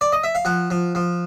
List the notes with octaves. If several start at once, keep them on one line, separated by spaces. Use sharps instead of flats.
D5
D#5
E5
F5
F3 F#5
F3
F3